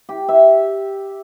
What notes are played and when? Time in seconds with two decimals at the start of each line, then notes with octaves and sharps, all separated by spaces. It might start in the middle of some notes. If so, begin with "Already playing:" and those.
0.09 G4
0.29 E5